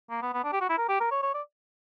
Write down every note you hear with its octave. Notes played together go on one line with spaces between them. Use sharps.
A#3
B3
B3
D4
G4
F#4
E4
A#4
G4
A#4
C#5
C#5
D5